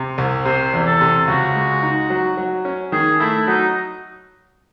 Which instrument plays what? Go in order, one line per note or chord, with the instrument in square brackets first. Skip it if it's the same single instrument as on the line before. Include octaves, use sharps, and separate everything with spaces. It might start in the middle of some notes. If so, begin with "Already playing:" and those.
Already playing: [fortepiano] C3
C2
[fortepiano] C3 [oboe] C5
[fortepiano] E2
[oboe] A4
[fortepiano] C3
[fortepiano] C#2 [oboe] F#4
[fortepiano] G#3
D#4
F#3
F#3
C#4
[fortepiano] D#3 [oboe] G#4
[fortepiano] A3 [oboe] E4
[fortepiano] F#3 [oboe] D#4